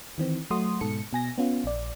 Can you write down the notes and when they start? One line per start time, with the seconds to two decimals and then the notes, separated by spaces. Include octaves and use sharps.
0.18 D#3 E3 C4
0.51 F#3 A3 F#4 C6 D#6
0.81 G#2 B2 A4 C#7
1.13 B2 G#5 A#6
1.38 B3 C#4 F4
1.64 A#1 D5